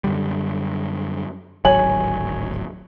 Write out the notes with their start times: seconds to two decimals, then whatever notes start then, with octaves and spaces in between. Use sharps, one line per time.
0.04 F#2 D3 G3
1.65 D1 G#1 F#3 C#5 G#5 F#7